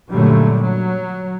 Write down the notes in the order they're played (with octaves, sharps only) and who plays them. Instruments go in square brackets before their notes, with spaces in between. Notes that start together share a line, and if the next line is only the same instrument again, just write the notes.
[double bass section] F#2 A#2 D3 F#3 G3 A3
F#3